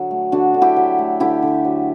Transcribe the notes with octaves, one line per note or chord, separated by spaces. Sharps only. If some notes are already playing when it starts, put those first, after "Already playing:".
Already playing: D3 F#3
A3
D3 D4 F#4
D3
E4 G4
F#3
A3
D3 E4 G4
D3
F#3